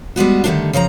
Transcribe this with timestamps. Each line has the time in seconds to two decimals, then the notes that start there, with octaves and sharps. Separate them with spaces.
0.16 G3 G#3 B3 F#4
0.44 D3 D#3 F#3 G3 A3 D4
0.73 C#3 F3 D#5 A#5